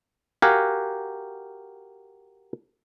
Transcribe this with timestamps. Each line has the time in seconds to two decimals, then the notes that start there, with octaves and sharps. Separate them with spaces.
0.42 F#4 G4 A#4 F5 F#5 G#5